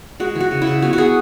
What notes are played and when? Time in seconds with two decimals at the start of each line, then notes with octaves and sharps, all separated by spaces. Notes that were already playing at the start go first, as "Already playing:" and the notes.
0.20 G#3 F#4
0.35 E3
0.40 F#4
0.51 C#3
0.62 E4
0.67 C#3
0.82 B3 F#4
0.93 F#4
0.98 B3 G#4